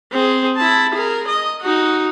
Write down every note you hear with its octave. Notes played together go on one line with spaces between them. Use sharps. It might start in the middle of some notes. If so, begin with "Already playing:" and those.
C4 G#4
E4 A5
G#4 A#4
D#5
D#4 F#4